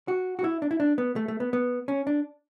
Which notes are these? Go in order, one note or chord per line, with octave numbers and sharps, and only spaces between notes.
F#4
F#4
E4
D4
E4
D4
B3
A3
A3
B3
B3
C#4
D4